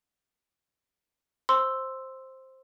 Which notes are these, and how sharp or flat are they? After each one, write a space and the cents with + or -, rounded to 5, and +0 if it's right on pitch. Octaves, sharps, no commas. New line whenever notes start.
C5 +10 C6 +0 E6 +0